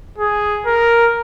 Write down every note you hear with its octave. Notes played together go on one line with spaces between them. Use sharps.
G#4
A#4